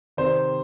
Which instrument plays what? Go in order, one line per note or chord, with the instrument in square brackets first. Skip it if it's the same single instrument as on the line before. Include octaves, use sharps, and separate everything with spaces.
[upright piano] C3 D#3 C5